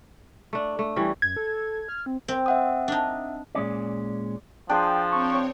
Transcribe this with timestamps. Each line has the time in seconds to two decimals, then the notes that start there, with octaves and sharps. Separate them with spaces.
0.53 A3 D4
0.79 A3
0.96 E3 G3 C#4
1.22 F#2 G#6
1.37 A4
1.88 F6
2.06 C4
2.28 C4
2.46 E5 F#5 D#6
2.88 D4 D#4
3.55 A#2 G#3 C#4 D5
4.69 F3 D4 G#4 C5 G5
5.12 C4 C#5 G5 C#6